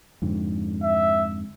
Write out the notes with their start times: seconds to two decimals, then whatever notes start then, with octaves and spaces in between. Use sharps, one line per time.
0.22 F2 G#2 D3
0.83 E5